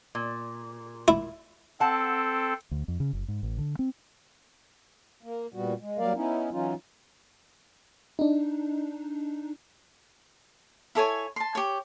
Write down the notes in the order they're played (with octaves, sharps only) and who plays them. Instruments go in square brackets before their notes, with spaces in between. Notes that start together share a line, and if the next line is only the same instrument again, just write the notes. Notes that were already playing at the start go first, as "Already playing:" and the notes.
[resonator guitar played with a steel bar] A#2
[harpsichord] E4
[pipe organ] C4 A4 [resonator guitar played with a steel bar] F#5 A5
[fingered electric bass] D2
F2
C#3
F#1
G#2
A1
D3
C4
[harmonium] A#3
A#2 G3 B3 F#4
G#3
F#3 G3 A#3 A#4 D5 F5
B3 C#4 D#4 E4
E3 F#3 C#4 D#4 F4
[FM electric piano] D4 D#4
[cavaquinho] E4 A4 C#5 G#5
A5 C6
G4 C#5